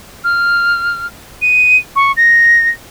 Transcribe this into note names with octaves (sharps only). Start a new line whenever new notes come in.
F6
D#7
C#6
A#6